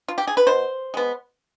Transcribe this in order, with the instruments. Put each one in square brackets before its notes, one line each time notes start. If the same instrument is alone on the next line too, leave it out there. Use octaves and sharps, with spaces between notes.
[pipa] F4
G4
G#4
B4
B2 C5
G#3 B3